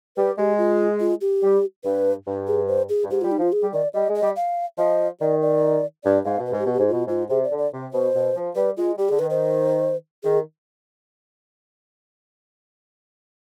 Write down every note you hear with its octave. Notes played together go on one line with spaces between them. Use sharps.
G3 B4
G#3 G4
F4
F4
G4
G3
G2 B4
G2
G#4
C5
G#4
G2
G#2 G4
F4
G3
D#4
F3 F4
G#4
G3
D#3 D5
G3 D#5
G#3
D#5
G3
F5
F3 D#5
D#3 D5
D5
G2 D5
G#2 F5
B2
B4
G#2
G4
B2
G4
G#2
B2 F4
G#2 F4
C3 G#4
D5
D3
D5
C3
B2 C5
B2
F3
G3 B4
G#3 F4
G3 G4
D3 G#4
D#3 B4
C5
D#3 G#4